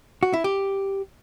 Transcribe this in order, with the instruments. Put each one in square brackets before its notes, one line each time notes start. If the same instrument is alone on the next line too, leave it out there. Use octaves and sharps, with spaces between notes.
[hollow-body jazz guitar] F#4
E4
G4